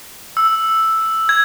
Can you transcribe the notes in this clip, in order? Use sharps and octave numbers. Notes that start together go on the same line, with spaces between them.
E6
G#6